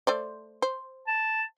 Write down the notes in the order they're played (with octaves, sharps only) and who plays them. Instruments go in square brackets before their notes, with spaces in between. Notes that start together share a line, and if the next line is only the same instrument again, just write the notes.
[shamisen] A3 C5 D5
C5
[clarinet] A5